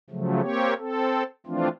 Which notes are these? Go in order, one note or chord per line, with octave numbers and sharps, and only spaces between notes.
C#3 F3 F#3 A3
A#3 C4 G4 C#5
C4 A4
E3 F3 A3 C4 D4 F4